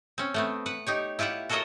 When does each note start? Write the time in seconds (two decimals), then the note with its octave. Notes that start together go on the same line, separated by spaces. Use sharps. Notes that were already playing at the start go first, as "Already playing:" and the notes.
0.18 C4 C#4
0.34 A3 B3 C4
0.66 B4 F#5
0.87 D#4 G4 C#5
1.19 E4 F4 G4 E5 F#5
1.49 F#4 A4 A#4 C#5 D#5 E5